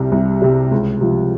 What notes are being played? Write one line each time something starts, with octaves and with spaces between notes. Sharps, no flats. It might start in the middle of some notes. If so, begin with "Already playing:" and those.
Already playing: C2 C3 G3
C2
C3 G3
C#2
C3 F3